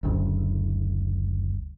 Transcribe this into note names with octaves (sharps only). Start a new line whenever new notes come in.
F#1 D2